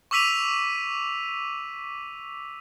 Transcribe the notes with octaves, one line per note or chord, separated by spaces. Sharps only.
C#6 D6 E6 B6 D#7 F7